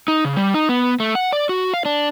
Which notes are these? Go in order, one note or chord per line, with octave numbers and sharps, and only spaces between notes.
D#4
C#3
G3
D#4
B3
A3
F#5
D5
F#4
F5
D4